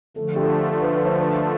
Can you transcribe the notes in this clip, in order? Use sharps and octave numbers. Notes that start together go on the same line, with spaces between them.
D3 F3 A3 A4
G4
A4
A4
B4
B4
C5
B4